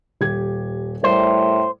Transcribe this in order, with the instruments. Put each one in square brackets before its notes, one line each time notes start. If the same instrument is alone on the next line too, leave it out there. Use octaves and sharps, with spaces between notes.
[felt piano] D#1 G4 G#6
[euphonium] A2 [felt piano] G3 A#4 D5 [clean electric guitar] C5